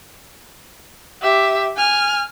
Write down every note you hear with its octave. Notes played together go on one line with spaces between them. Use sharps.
G4 E5
G#5 F6